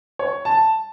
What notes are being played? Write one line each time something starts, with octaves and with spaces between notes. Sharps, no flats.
C#5
A5